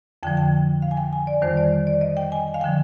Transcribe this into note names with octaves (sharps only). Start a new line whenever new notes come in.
F2 D3 F3 G5
G5
F5
G#5
G5
G#5
D5
F2 D#3 G3 C5
D5
D5
D#5
G5
G#5
F5
D3 F3 G5